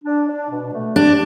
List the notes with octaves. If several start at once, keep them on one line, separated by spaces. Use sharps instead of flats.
D4
D4
B2
A3
D4 G4